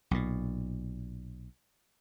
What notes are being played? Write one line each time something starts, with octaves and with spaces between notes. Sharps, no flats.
B1 A#2